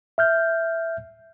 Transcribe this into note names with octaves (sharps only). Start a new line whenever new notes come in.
E5 F6 G6